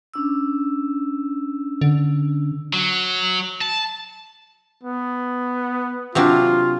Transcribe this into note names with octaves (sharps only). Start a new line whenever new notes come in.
C#4 D4 E6
D3
F#3
A5
B3
C3 F#3 D4 F4